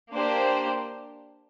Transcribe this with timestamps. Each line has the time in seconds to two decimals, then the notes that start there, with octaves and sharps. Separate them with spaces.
0.12 A#3 D4 G4 C5